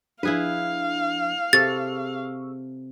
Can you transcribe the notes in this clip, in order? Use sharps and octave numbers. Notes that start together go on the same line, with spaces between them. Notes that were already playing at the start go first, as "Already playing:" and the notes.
F3 D4 E4 G#4 B4 F5
C3 G#4 A4 C#6 E6 A6